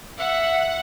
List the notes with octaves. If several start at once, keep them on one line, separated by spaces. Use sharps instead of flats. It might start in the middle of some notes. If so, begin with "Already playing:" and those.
E5 F#5